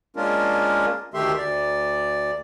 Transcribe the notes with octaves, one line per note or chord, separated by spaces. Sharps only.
G#3 A#3 C#4 D4 F4 A#4
D2 D#3 A3 G4 E5 C6
D2 D5